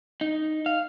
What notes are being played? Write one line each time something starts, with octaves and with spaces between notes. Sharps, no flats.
D#4
F5